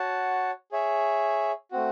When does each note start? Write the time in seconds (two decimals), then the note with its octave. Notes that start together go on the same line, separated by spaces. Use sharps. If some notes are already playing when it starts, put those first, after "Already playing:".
Already playing: F#4 C#5 F#5 A5
0.72 G#4 C#5 E5
1.71 A3 C4 F#4